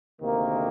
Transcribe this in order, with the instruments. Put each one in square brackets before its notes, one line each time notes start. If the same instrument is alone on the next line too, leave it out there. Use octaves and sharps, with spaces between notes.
[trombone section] D2 C3 D#3 A#3